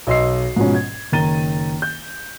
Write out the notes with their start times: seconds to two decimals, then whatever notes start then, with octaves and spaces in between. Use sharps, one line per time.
0.07 B1 D#5 C6 E6 C7
0.56 G#2 B2 F3 C#4
0.75 G#6
1.12 F#1 D#3 A#5 A6 D#7 G7
1.82 G6